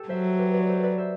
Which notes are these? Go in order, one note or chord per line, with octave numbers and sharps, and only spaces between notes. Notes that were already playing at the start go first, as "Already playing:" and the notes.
Already playing: G4 A4
F#3 C5 E5
G4 B4
B4 D5
A4 C5
B4 D5
C5 E5